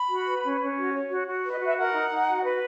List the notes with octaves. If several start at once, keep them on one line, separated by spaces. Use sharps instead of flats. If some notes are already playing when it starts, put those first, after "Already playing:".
Already playing: B5
F#4
B4
C#4
C#4
F#4
C#5
F#4
F#4
B4
D#5
F#4 E5
A#4 F#5
D#4
D#4
F#4
B4